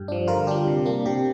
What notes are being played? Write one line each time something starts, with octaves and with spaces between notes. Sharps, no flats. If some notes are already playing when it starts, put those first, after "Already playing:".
Already playing: G2 G4
F3 D4
D3 F4 A#4
G3 D4 G4
C3
A#3 D4
C3 G4